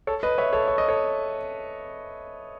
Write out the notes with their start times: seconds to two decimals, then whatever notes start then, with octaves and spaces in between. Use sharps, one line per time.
0.07 A4 C#5
0.23 B4 D#5
0.38 C#5 E5
0.52 A4 C#5
0.68 C#5
0.78 D#5
0.88 A4 C#5